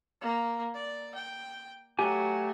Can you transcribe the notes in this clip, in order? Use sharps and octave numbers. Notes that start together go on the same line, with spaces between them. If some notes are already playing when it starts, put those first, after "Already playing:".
A#3
D5
G5
F#3 A3 G4 G#5